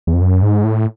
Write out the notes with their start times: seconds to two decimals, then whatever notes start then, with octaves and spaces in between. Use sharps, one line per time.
0.07 E2
0.14 F2
0.21 F#2
0.42 G#2
0.64 A2